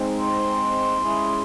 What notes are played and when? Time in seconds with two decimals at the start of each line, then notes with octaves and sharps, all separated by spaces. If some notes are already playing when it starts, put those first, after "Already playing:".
Already playing: G#3 C4 D#4
0.19 C6
1.01 G#3 C#4 E4 G#4